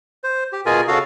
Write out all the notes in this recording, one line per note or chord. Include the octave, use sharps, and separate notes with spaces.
C5
G4
B2 F4 G#4 A#4 G#5
C#3 F#4 A4 F5